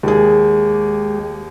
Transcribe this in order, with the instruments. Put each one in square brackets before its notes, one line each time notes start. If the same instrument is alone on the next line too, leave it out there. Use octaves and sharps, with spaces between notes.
[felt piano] D#2 G#4 [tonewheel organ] G#3 G4